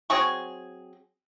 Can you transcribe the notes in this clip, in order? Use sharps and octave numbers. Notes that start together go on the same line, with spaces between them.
F#3 C4 G#4 C#6